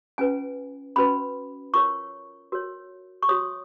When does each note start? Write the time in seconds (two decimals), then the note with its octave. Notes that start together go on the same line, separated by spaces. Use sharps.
0.18 C#4 F4 B4 G#5
0.96 C#4 F#4 B4 B5
1.74 F4 A#4 C#5 C#6
2.52 F#4 A#4 C#5
3.23 C#6
3.29 F#4 C#5 D#6